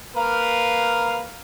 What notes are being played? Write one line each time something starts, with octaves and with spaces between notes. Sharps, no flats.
A#3 B4 F5